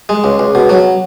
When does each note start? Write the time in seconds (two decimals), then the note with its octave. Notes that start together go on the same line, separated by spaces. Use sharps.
0.09 G#3
0.24 C#2
0.39 C#2
0.55 B2
0.69 F#3